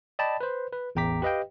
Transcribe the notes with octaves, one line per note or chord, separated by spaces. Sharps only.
D5 D#5 G5 A5 B5
B4 C5
B4
A1 E2 G5 A#5 D6 B6
G4 B4 D#5 F5 G5